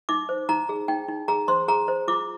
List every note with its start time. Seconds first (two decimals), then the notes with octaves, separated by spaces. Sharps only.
0.09 D#4 D6
0.29 C5
0.49 D#4 A#5
0.69 G#4
0.88 D#4 G5
1.08 D#4
1.28 G#4 A#5
1.48 C5 C6
1.68 G#4 A#5
1.88 C5
2.08 F4 D6